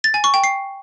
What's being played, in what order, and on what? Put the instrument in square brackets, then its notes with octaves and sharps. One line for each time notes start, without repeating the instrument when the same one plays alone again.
[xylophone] A6
G#5
C#6
G5
C7